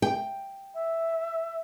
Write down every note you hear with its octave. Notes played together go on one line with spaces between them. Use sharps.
G5
E5